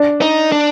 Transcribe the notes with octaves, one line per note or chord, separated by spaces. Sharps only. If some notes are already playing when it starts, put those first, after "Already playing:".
Already playing: D4
D#4
D4